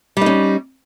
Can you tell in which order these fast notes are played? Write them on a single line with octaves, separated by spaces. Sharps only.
G3 D#4 C#4